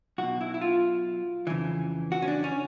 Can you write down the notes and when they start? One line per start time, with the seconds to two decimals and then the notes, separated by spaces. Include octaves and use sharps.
0.18 B1 B2 F#4
0.41 E4
0.54 E4
0.61 F4
1.47 F2 C#3 E3
2.12 F#4
2.22 C#4
2.28 D4
2.44 C#4